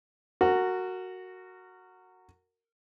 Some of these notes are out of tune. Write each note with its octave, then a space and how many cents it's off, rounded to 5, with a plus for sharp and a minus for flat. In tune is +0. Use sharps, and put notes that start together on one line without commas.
F#4 +0 A#4 -25